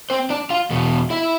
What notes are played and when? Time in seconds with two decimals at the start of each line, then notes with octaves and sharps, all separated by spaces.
0.10 C4 C5
0.30 D4 D5
0.50 F4 F5
0.70 E2 B2
1.10 E4 E5